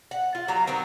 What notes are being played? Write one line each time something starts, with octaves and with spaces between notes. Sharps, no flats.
F#5
F4
F#3 G3 A#5
D#3 F#3 B3 C4